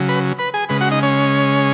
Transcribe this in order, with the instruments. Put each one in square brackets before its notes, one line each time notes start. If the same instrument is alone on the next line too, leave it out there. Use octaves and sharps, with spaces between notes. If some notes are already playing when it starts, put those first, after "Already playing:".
Already playing: [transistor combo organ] C#3 F#3
B4 B5
B4 B5
G#4 G#5
C#3 G#3 B4 B5
F#4 F#5
D#4 D#5
C#4 C#5